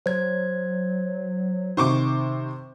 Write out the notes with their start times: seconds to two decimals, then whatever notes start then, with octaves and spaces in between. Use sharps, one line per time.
0.06 F#3 C5 G#6
1.77 C3 D#3 C5 C#6 D6